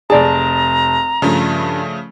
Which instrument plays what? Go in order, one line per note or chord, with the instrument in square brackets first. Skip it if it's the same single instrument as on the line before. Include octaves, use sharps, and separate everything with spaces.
[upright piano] F1 A5 [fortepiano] G#4 D5 [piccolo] A#5
[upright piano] G2 [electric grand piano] C#3 F3 A3